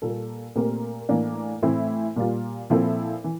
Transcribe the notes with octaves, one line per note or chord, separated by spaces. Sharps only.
A#2 G3 A#3 F4 A4
A#2 A3 C4 G4 A#4
A2 E3 A#3 D4
A2 E3 A3 C4 E4
A#2 G3 A#3 F4
A#2 F3 C4 E4 A4
E3